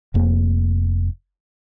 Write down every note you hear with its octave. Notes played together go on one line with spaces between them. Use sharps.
F1 F2 A#3